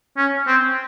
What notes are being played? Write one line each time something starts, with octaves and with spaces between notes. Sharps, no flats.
C#4
C4